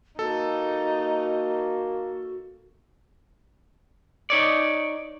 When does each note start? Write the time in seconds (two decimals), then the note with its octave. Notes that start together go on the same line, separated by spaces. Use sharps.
0.19 A#3 D#4 F#4 A4
4.30 D#4 C#5 D5